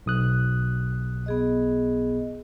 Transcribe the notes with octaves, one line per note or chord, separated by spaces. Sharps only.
B1 D#6 F#6
B3 G#4 D#5